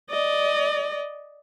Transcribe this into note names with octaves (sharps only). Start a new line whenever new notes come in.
D5 D#5